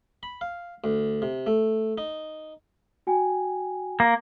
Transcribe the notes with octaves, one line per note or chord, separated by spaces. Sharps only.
B5
F5
D2
C3
A3
D#4
F#4 G5 G#5
A#3